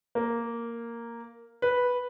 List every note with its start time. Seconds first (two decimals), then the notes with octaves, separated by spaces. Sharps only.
0.15 A#3
1.62 B4